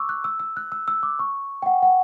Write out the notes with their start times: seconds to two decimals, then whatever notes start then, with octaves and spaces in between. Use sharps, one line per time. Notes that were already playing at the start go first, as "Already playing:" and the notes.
Already playing: C#6 D6 E6
0.09 F#6
0.24 E6
0.40 E6
0.57 F#6
0.72 E6
0.88 E6
1.03 D6
1.19 C#6
1.62 G5
1.66 F#5
1.82 F#5